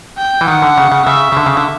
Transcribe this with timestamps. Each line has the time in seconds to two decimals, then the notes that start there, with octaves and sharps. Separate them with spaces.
0.18 G5
0.41 E3
0.47 D#3 F#5
0.62 D3
0.78 C#3
0.92 C#3
1.07 C#3 E5
1.32 C#3
1.37 D3
1.46 C#3
1.57 D3